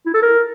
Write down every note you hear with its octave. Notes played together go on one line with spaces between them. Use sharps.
E4
A4
A#4